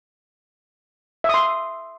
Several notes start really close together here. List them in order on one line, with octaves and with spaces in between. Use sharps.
E5 D#6 C6